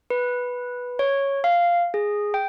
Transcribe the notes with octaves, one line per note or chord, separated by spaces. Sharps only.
B4
C#5
F5
G#4
G5